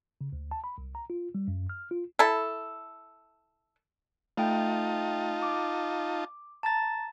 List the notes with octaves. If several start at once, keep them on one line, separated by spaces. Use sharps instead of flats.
C#3
D2
A5
B5
C2
A#5
F4
G3
F#2
F6
F4
E4 A4
A3 D#4 F4 G5 A5
D6
A5 A#5 A6